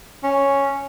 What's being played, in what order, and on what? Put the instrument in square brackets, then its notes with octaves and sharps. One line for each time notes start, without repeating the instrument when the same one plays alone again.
[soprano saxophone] C#4